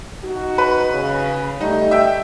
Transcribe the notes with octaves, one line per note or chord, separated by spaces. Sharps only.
D#4 F#4
B4
C#3
G3 A3 D#4
E5 G5